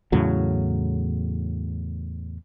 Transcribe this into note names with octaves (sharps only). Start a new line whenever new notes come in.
E2 A2 C#3 F#3